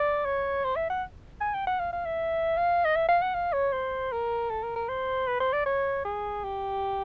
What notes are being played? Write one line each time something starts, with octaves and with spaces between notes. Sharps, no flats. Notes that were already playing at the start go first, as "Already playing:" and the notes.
Already playing: D5
C#5
C5
E5
F#5
G#5
G5
F#5
F5
F5
E5
F5
D#5
E5
F5
F#5
F5
C#5
C5
A#4
A4
A#4
A#4
C5
B4
C5
D5
C#5
G#4
G4